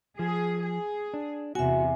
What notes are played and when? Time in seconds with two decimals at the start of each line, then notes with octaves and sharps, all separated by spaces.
0.19 F3 G#4
0.63 G#4
1.14 D4
1.55 E2 C3 F#4 E5 G#5